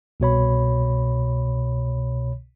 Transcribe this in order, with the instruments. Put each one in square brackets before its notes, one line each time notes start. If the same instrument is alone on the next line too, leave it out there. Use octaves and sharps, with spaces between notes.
[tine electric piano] C2 B2 C#5 B5